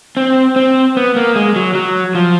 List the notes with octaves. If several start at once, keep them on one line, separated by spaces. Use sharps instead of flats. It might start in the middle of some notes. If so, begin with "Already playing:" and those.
C4
C4
B3
A#3
G#3
F#3
F#3
F3